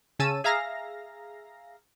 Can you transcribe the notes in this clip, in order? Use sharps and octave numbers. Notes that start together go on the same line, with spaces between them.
C#3 C#4 A5 E6 D#7
G#4 E5 F5 A#5 A#6